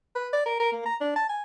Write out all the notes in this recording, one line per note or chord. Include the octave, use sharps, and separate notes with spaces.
B4
D5
A#4
A#4
A#3
A#5
D4
A5
G#5